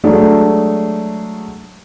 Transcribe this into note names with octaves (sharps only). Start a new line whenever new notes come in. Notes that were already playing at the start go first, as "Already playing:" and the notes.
F#3 G#3 A3 D4